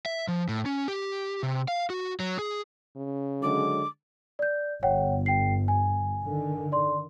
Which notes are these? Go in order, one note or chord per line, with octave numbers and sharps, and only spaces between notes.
E5
F3
A2
C#4
G4
C3
F5
F#4
F#3
G#4
C#3
D3 F#3 G#3 D6
D5 G6
G1 C#5 F#5 G5
G5 C7
G#5
D3 D#3
D5 C6